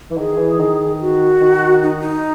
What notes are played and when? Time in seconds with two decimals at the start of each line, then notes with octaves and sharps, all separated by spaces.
0.11 E3
0.17 D#3 G#4
0.38 E3
0.59 D#3
1.00 F#4
1.41 D#3
1.83 D#4
2.00 D#4